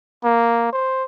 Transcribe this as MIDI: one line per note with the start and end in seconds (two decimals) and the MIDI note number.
0.24 0.72 58
0.73 1.04 72